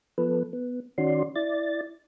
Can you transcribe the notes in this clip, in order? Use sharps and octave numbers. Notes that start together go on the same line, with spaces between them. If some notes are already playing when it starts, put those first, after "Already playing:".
F3 B3 A4 B4
B3
D#3 C#4 F#4 D5 C6
E4 D5 A6